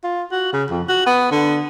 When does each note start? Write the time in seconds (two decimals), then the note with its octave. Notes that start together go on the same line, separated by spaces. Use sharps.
0.04 F4
0.32 F#4
0.53 C#3
0.70 F2
0.89 F#4
1.06 B3
1.32 D3